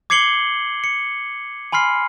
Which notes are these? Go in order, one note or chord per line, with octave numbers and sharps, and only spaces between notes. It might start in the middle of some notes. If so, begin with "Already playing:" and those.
D6 G#6 C7 C#7 F#7 G7
C#7
G#5 B5 C6 F6 C7